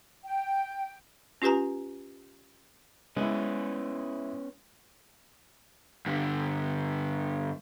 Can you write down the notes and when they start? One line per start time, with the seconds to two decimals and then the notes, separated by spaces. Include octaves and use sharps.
0.25 G5
1.42 C#4 F4 G4 B4 G#5 A#5
3.16 G#3 B3 C#4 E4 B4
6.06 G2 D3